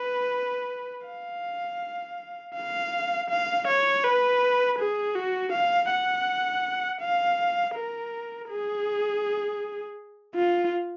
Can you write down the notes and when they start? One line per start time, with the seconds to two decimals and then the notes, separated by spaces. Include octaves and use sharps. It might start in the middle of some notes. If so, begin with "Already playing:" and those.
Already playing: B4
1.07 F5
2.55 F5
3.30 F5
3.67 C#5
4.04 B4
4.78 G#4
5.15 F#4
5.52 F5
5.90 F#5
7.01 F5
7.75 A#4
8.49 G#4
10.35 F4